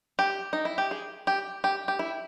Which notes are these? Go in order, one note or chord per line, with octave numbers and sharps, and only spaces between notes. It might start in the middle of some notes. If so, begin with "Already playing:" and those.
G4
D#4
E4
G4
G#4
G4
G4
G4
E4